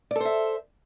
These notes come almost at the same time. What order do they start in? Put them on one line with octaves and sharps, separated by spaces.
D5 A4 C5 E5